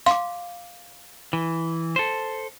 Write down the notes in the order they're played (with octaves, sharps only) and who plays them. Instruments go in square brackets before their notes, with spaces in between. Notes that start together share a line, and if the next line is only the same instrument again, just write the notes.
[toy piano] F5 D6 [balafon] C6
[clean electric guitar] E3
A4 C5